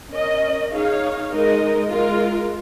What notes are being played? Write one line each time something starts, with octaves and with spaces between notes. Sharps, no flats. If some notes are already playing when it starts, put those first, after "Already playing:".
C#4 A#4 D#5
D#4 G#4 C#5 F5
G#3 D#4 A#4 D#5
G#3 F4 A#4